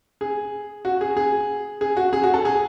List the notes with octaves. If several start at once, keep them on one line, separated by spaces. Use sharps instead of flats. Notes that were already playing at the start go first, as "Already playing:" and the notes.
G#4
F#4
G#4
G#4
G#4
F#4
G#4
F#4
A4
G#4